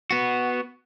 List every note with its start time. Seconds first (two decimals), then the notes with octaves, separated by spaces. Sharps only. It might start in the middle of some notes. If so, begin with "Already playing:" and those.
0.11 B3 F#4